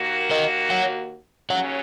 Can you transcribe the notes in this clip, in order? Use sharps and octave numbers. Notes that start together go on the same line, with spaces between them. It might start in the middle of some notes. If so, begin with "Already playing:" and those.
Already playing: D#2 D#3 A#3 F#4
A#4 D#5
C#5 F#5
D#2 C#3 F#3 C#4 C#5 F#5